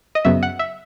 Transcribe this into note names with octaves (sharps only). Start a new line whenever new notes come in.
D#5
F#2 C#3 F#3 B3 E5
F#5
E5